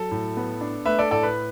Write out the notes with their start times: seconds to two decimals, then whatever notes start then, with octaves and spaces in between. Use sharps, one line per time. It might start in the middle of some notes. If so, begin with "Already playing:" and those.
Already playing: F#3 A4
0.11 A2
0.37 B3
0.61 D4
0.86 A3 B4 E5
0.99 A4 D5
1.11 A2 A4 D5
1.23 B4